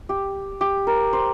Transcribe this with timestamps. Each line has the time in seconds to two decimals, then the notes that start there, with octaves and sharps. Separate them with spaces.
0.09 G4
0.61 G4
0.87 A#4
1.13 C5